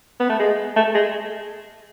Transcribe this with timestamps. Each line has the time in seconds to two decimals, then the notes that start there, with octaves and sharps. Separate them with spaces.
0.20 B3
0.30 A3
0.40 G#3
0.76 A3
0.95 G#3